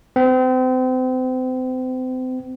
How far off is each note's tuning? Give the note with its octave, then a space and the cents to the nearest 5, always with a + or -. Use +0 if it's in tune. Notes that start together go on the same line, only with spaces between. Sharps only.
C4 -35